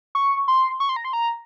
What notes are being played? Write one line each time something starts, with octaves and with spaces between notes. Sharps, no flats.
C#6
C6
C#6
C6
A#5
C6
A#5